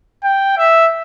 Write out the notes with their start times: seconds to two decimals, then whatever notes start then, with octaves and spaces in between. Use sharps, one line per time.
0.24 G5
0.57 E5